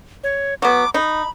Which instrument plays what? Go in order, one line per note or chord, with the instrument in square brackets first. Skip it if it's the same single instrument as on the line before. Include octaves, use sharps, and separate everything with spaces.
[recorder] C#5
[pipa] F#3 B3 [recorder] D6
[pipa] D#4 [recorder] B5